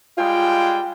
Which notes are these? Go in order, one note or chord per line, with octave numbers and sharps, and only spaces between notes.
G3 G#3 F4 G5